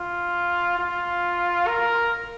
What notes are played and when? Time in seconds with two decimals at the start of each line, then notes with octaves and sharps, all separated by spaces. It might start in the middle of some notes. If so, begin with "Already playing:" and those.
Already playing: F4
0.79 F4
1.67 A#4